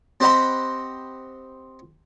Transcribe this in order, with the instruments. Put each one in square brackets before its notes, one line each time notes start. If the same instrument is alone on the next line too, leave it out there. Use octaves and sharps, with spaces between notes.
[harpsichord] C4 G4 C5 D#5 F#5 B5